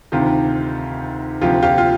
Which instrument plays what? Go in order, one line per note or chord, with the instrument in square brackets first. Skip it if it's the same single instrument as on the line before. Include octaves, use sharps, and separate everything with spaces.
[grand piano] D2 C3 D#3 [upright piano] F4 G4
[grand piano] D2 C3 F3 [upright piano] F4 G4
[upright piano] F4 G4
F4